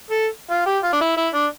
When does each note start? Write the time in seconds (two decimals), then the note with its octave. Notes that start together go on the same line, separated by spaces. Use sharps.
0.11 A4
0.51 F4
0.66 G4
0.84 F4
0.93 D4
1.01 E4
1.17 E4
1.34 D4